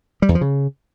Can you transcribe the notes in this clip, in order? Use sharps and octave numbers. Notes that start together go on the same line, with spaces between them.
G3
E2
F3
C#3